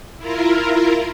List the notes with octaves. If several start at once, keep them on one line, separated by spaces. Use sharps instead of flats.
E4 F4 A#4